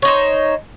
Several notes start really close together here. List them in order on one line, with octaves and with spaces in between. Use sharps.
C#5 D#4 C5